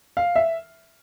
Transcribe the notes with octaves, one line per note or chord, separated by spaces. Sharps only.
F5
E5